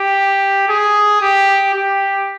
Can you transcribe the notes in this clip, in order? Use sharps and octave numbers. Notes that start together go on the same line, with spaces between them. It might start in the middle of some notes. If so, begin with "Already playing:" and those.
Already playing: G4
G#4
G4
G4